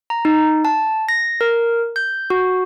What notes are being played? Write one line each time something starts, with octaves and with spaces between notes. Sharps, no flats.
A#5
D#4
A5
A#6
A#4
G6
F#4